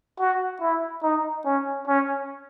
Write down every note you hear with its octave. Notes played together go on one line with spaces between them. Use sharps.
F#4
E4
D#4
C#4
C#4